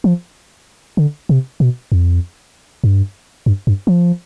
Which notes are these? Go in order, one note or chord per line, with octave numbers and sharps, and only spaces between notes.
F3
D3
C3
B2
F2
G2
G2
G2
F3